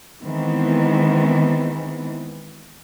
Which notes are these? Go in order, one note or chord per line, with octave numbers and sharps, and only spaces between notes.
D#3 E3 G#3 B3 C4